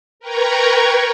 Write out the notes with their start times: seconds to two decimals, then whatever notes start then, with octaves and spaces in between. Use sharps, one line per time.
0.20 A#4 B4 G5 A#5 C#6 G#6